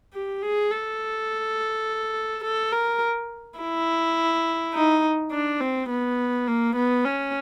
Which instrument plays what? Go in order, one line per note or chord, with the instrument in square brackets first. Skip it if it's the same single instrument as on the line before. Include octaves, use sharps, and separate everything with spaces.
[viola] G4
G#4
A4
A4
A#4
E4
D#4
D4
C4
B3
A#3
B3
C#4